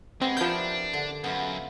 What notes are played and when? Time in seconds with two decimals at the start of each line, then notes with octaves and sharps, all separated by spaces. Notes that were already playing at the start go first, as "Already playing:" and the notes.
0.21 G#3 B3 C4 G4
0.37 F3 D4 E4 A#4 G6
0.93 D3
1.24 F#2 B3 F4 E5